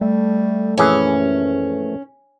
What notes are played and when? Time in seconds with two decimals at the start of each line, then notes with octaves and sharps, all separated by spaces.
0.01 G3 A3
0.77 A#1 F#2 E3 C#4 G#4